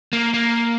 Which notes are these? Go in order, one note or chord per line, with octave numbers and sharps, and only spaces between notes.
A#3
A#3